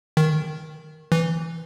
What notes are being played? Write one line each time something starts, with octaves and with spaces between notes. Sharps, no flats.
D#3
E3